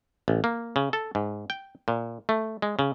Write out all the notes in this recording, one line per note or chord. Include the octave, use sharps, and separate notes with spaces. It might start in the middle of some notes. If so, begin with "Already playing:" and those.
A1
A#3
C#3
A4
G#2
G5
A#2
A3
G#3
C#3